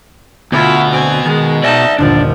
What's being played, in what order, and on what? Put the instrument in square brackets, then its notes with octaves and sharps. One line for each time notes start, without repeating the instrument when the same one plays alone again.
[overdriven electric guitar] D2 [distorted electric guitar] B2 [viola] E4 F4 [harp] F#5 B5 G6
[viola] C4 G#5
[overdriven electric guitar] D#3 [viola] G#3
[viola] D#4 A5 [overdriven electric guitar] D5 E5
[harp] G1 D#2 A#2 [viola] F3 [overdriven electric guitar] D4